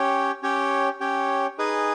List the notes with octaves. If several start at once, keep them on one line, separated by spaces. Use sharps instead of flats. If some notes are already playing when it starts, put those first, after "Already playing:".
Already playing: C#4 G4 C#5 G5
C#4 G4 C#5 G5
C#4 G4 C#5 G5
D#4 G#4 B4 D#5 G#5